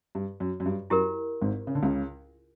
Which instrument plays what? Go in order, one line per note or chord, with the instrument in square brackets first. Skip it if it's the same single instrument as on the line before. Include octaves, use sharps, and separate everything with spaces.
[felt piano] G2
F#2
F#2
G2
[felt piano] F#2 [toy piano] E4 G4 A#4
[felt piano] G#1 G#2
C#3
D3
C#2 C#3